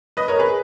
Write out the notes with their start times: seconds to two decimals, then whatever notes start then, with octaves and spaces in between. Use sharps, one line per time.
0.17 B4 D#5
0.28 A#4 C#5
0.39 G#4 B4